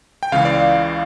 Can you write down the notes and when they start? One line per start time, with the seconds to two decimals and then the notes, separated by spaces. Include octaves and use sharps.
0.23 G5
0.32 C#2 C#3 E3 F5
0.45 D5